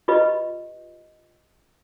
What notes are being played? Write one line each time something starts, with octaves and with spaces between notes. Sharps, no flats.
F4 G4 B4 D#5 B5